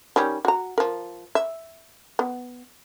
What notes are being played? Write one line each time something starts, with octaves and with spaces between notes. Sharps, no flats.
D#3 G3 C#4
F#4 A#5
F3 A#4
E5
B3